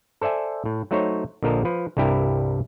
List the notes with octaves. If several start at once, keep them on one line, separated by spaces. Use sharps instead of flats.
A4 C5 D5 E5 G#5
A2
F#3 A3 D#4 C5 C#5
A#1 D3 F3 A#4 D#5 A5
F3 B4
C2 G2 G3 E4 G4 A#4